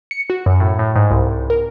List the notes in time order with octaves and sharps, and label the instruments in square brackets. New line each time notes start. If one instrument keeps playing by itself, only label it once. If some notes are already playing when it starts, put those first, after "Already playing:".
[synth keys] C#7
F#4
F#2
A2
A2
G#2
C2
C2
A#4